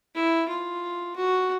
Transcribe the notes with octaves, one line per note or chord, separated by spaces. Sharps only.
E4
F4
F#4